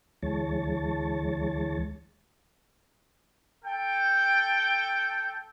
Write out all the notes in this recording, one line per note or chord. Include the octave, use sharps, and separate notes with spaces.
D2 E3 G#3 C#5 A5
A4 G5